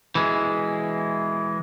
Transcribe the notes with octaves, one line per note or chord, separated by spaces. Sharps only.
E3 G#3